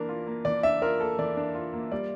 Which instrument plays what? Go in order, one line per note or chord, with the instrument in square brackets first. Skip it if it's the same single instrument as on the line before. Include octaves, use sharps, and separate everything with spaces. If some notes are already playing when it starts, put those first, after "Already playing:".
Already playing: [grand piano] E3 A#3 D4 [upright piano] A#4
[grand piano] F4
A#3
[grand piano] E3 [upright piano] D5
[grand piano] D4 [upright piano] E5
[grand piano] F4 [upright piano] A#4
[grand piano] A#3 [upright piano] A4
[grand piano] E3 [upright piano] D5
[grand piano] D4
F4
A#3
[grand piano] G3 [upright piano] D5